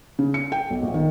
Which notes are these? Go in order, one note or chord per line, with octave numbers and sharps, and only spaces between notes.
C#3
C#7
G5
B1
A#1
D#3